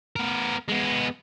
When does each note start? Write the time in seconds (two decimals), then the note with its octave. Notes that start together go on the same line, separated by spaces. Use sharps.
0.16 B3 A#4
0.69 G#3 B3